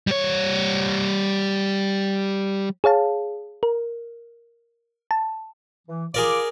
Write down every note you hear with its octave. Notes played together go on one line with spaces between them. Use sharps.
G3 C#5
G#4 C#5 F5 A5
A#4
A5
E3
F4 G#4 A#4 D5 D6